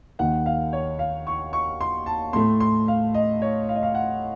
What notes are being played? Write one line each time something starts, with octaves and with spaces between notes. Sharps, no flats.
D#2 D#3 A#3 F#5
F5
C#5
F5
C#6
C#6
C6
A5
A2 A3 C6
C6
F5
D#5
C#5
F5
D#5
F5
F#5